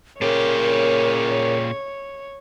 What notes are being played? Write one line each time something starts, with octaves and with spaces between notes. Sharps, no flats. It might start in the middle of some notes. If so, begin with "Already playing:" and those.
A#2 C#3 G4 A#4 C#5